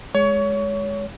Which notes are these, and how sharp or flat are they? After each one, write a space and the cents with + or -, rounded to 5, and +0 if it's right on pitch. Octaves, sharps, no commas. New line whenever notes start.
G#3 +0 C#5 +25 C#6 +30